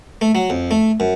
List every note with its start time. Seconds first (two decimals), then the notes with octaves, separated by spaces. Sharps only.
0.21 A3
0.35 F#3
0.50 F2
0.71 A3
1.00 F#2